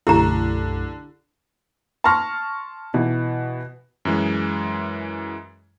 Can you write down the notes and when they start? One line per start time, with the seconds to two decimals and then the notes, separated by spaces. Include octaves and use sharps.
0.07 B1 F#2 D3 A3 E4 G4 A#5
2.04 A5 C6 C#6 F6 A#6
2.94 B2 E3
4.05 F#2 E3 G#3